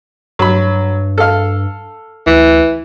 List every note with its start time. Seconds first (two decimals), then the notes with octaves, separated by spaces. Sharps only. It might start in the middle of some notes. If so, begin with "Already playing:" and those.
0.39 G2 F#3 B5
1.18 A4 F5
2.26 D2 E3